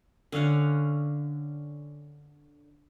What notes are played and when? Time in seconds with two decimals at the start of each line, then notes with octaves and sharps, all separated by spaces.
0.32 D3 C#4 F5 F#5